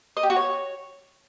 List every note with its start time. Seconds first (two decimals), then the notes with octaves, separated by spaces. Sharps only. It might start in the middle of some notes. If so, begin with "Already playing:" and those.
0.17 D#5
0.23 G4
0.30 F#4
0.36 C#5